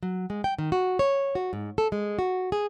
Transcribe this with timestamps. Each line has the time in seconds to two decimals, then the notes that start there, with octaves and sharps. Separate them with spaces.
0.03 F#3
0.30 G#3
0.44 G5
0.58 D#3
0.72 F#4
0.99 C#5
1.35 F#4
1.53 G#2
1.78 A4
1.92 G#3
2.19 F#4
2.52 G#4